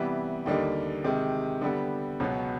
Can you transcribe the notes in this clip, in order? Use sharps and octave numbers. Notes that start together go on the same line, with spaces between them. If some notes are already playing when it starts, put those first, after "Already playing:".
Already playing: C3 E3 G3 B3
D#2 D3 G3 A#3 D#4
C3 D#3 G#3
D3 G3 B3
C#2 B2 F#3 B3